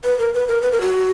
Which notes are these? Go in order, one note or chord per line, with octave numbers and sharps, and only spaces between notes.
B4
A#4
B4
A#4
B4
A#4
F#4